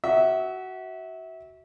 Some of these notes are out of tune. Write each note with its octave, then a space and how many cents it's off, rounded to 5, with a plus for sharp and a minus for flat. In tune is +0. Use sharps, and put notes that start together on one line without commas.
F#4 +15 E5 -20